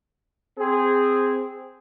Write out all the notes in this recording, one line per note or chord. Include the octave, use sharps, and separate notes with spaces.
C4 G#4